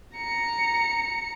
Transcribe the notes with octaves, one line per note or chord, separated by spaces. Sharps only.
A#5 C#7